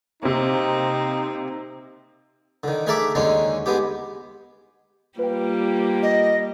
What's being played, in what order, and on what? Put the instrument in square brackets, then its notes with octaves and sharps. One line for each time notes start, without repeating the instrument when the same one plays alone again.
[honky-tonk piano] C3 A#3 [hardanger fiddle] C4 [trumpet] D#4
[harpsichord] D3 D#3
A3 G#4 A#4 E5 A5 D6
D#2 D3 G#3 C#4 D#4
G#3 B3 G4
[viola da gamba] G3 A#3 [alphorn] F4 [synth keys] B4 G5
[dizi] D#5